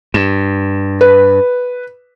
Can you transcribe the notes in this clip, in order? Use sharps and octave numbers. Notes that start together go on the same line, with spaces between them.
G2 E7
B4